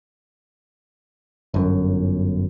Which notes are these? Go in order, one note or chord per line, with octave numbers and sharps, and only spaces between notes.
G1 F#2